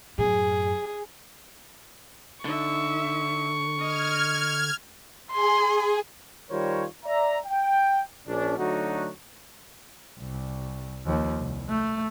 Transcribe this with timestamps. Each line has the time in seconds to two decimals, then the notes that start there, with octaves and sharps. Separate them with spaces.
0.18 F#2 A2 G#4
2.45 D3 D#4 E5 C#6
3.79 D#5 F6 G#6
5.32 G#4 G#5 C6
6.50 D#3 G3 F4 A#4 C5 C#5
7.05 D5 E5 A#5
7.45 G5
8.27 A#1 C#4 D4
8.58 D3 F#3 A3 D4 D#4 F#4
10.19 C2
11.05 D#2 F3
11.40 C2
11.70 A3